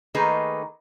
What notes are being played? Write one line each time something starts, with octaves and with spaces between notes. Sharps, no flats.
D#3 A3 A#3 D#4 G#4 B4